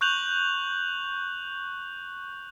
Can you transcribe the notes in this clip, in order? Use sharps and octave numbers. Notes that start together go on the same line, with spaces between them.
C#6 F#6 G6 F7 F#7